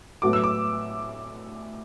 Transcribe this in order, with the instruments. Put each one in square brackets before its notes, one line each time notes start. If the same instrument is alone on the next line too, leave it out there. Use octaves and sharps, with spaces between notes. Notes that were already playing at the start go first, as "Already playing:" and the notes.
[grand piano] A2 F#3 B3 F#4 A4 [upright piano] D6
[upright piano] E6
D6